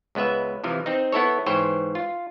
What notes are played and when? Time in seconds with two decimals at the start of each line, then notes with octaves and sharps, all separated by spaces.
0.15 C#2 G#3 B3 B4 E5
0.64 C3 E3 F3
0.86 C4 D#4
1.12 B3 E4 A4 C#5
1.46 G#2 E3 C5 C#5 G5
1.95 F4